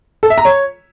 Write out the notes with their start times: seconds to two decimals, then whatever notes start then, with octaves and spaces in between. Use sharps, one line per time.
0.23 A4
0.30 E5
0.38 A#5
0.45 C#5